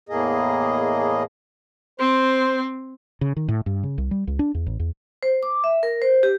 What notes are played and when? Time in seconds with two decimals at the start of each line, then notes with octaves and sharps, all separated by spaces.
0.09 E2 A2 A#3 G#4 D#5
2.00 C4 C5
3.21 C#3
3.37 D#3
3.48 A2
3.66 G2
3.83 C#3
3.98 C2
4.11 G3
4.27 C#2
4.39 D4
4.55 E2
4.67 A1
4.80 E2
5.23 C5
5.43 D6
5.64 E5
5.83 A#4
6.02 C5
6.23 G4